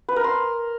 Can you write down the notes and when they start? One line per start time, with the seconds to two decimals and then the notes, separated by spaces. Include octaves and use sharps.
0.09 B4
0.16 A#4
0.24 C6